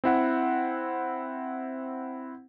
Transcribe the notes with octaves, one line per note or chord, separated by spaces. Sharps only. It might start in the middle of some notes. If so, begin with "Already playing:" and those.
C4 E4 F#5